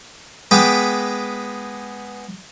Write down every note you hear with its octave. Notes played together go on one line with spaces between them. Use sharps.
G#3 B3 G5 B5 D6